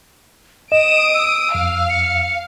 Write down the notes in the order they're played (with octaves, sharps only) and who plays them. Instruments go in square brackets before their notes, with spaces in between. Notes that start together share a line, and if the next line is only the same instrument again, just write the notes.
[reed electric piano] D#5 [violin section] D#6 D7 [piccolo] E7
[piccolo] E6
[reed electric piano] F2 [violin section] F5
[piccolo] C#7